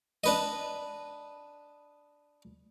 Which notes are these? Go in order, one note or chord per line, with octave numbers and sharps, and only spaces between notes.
D4 B4 D#5